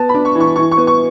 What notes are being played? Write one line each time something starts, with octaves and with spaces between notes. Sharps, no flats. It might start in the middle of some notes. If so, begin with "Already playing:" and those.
Already playing: B3 A5
B5
D4
C#6
E3
C#6
E3 C#6
C#6
B3
C#6